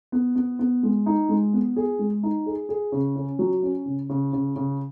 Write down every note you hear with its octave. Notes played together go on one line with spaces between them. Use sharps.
B3
B3
B3
G#3
D#4
G#3
B3
G#4
G#3
D#4
G#4
G#4
C#3
C#4
F#3
C#4
C#3
C#3
C#3
C#3